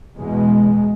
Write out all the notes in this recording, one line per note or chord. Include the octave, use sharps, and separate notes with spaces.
E2 B2 G#3